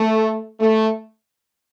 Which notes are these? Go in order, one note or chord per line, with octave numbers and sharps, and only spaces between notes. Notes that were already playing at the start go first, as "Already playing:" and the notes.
Already playing: A3
A3